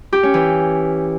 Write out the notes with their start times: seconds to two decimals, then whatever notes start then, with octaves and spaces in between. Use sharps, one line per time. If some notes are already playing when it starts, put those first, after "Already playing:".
0.13 G4
0.23 C#4
0.34 E3